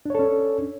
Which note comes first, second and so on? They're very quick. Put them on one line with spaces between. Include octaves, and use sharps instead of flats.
D4 C#5 A4 C#4